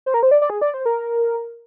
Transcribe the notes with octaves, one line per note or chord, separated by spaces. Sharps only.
C5
A#4
C5
D5
D5
G#4
D5
C5
A#4